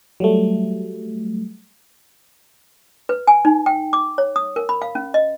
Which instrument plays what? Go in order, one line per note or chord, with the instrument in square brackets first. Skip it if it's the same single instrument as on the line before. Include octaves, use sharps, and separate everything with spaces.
[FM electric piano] F#3 G3 A3
[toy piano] B4
G#5
D#4
G5
D6
C#5
D#6
A#4
B5
F5
C#4
D#5